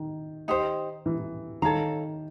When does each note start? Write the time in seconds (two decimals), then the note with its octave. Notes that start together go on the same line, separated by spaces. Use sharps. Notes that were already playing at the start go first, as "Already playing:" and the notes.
Already playing: D#3
0.48 D#4 G4 C5
1.06 E3
1.62 D#3 A4 C#5 F5 A#5